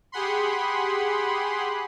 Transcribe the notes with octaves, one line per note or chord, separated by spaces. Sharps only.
G4 G#4 F#5 B5 C6